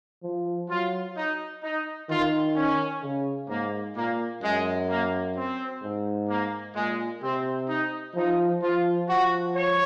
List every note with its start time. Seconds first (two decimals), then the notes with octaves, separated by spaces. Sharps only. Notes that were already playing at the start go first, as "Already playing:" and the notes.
0.23 F3
0.69 F#3 F4
1.16 D#4
1.63 D#4
2.10 D#3 F4
2.56 C#4
3.03 C#3
3.49 G#2 A#3
3.96 A#2 A#3
4.42 F#2 G#3
4.89 A#3
5.36 C4
5.83 G#2
6.29 A#3
6.75 A#2 G#3
7.22 C3 C4
7.69 D#4
8.15 F3 D#4
8.62 F3 F4
9.09 F3 F#4
9.55 C#5